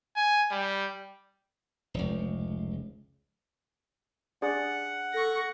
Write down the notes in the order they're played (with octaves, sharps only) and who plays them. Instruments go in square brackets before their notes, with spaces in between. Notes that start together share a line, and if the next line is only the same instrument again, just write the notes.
[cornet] G#5
G3
[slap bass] F1 C#2
[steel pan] D4 G#4 D5 [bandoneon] F#5
[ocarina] A4 [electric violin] C#6 A#6